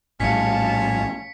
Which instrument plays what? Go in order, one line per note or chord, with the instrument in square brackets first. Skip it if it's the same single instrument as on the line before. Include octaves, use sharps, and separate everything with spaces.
[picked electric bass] A#1 A2 G3 [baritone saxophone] C#4 [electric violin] F5 A5 [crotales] B6 C#7